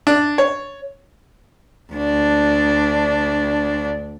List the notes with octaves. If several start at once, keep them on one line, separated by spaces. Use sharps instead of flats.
D4
C#5
D2 D4